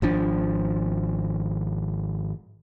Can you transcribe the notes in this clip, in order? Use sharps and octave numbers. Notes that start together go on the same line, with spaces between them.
G#1 F3 D4